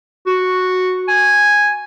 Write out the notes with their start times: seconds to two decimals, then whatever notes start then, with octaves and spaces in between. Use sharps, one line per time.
0.27 F#4
1.08 G#5